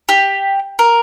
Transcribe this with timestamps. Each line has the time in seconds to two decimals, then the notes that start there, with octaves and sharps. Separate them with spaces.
0.09 G4
0.79 A#4